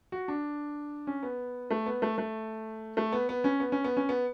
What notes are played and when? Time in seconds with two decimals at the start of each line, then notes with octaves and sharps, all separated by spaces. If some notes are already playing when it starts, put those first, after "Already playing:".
0.12 F#4
0.28 D4
1.07 C#4
1.23 B3
1.71 A3
1.86 B3
2.02 A3
2.18 A3
2.97 A3
3.12 B3
3.29 B3
3.44 C#4
3.60 B3
3.72 C#4
3.84 B3
3.97 C#4
4.09 B3